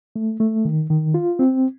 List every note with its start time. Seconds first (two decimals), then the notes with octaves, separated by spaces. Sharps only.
0.16 A3
0.40 A3
0.65 D#3
0.90 D#3
1.14 F4
1.39 C4